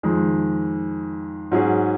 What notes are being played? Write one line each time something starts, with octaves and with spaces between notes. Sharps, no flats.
F2 D#3 G#3
G#2 F#3 C#4 G#4